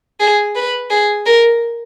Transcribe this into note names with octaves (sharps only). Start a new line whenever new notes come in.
G#4
B4
G#4
A#4